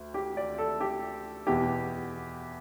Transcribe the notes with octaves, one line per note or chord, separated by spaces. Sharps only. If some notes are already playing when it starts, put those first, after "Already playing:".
Already playing: D2
G4
D5
A4
G4
E2 B2 G4